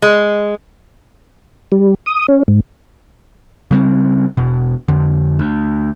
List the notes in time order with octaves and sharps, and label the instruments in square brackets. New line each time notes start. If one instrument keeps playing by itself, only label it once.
[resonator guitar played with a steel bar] G#3
[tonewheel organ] G3
D#6
C#4
G#2
[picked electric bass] C#3 G3 A#3 C4
E1 B2
F2 D3
D2